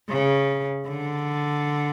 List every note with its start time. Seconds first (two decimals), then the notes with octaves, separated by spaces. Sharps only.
0.10 C#3
0.87 D3